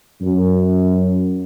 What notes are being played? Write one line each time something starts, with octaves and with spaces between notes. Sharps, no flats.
F#2